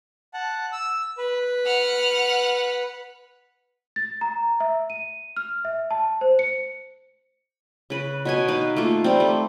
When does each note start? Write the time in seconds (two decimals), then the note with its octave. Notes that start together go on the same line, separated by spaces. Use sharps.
0.34 F#5 A5
0.72 E6
1.18 B4
1.66 F#5 F6
3.96 A6
4.21 A#5
4.60 E5
4.90 D#7
5.36 F6
5.65 E5
5.91 A5
6.21 C5
6.39 C#7
7.90 C#3 B4
8.25 B2 C#5 G#5
8.48 D#4 B4 F5
8.76 A3 A#3 F4
9.04 G3 C4
9.20 A3